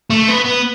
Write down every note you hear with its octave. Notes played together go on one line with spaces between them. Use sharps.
A3
B3
B3